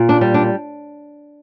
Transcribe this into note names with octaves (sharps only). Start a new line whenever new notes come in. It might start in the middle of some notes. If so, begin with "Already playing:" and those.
Already playing: A#2
D4
G3
D4